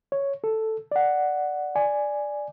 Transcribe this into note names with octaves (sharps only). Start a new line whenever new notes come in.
C#5
A4
D5 F#5
D5 G#5